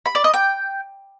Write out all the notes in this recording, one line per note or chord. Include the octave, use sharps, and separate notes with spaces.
B5
D5
D#5
G5